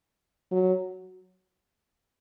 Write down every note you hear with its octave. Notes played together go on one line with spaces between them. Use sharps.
F#3